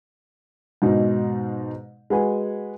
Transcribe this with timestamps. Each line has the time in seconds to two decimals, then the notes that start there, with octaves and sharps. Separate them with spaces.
0.82 G#2 B2 D#4
2.10 G#3 F#4 B4 G#5